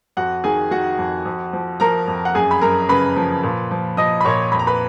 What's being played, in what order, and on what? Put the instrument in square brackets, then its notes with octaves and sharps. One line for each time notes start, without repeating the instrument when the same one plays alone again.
[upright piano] F2 F#4 F#5
D#3 G#4 G#5
D#3 F#4 F#5
F2
F2
F3
F3 A#4 A#5
F2
F#5
F#2 G#4 G#5
B5
F#2 A#4 A#5
C#3 B4 B5
F3
A#2
F3
F3 D#5 D#6
B5
A#2 C#5 C#6
F2 B5
A#5
B4 B5